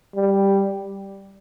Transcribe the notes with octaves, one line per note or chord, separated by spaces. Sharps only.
G3